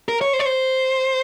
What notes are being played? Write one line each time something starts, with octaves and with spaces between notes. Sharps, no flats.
A#4
C#5
C5
C#5
C5